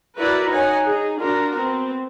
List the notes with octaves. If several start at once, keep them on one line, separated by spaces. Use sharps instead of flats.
E4 F#4 A#4 B4 D5 E5
D#4 C#5 F#5 G#5
D#4 G#4
D4 F4 F#4 A#4
B3 C4